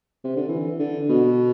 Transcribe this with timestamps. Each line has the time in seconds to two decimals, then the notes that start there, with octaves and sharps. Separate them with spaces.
0.24 C3
0.36 D3
0.49 E3
0.80 D3
1.09 B2